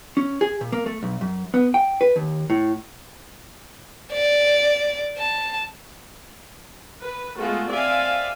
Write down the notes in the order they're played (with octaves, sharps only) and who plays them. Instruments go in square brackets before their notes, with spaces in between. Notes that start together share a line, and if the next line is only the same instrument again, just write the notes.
[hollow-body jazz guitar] C#4
G#4
A#2
A#3
A3
B1
F#2
B3
G5
B4
D#2
A2
[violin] D5
A5
[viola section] B4
G#3 A3 B3 F4 F#4
C4 D5 E5 F5 G#5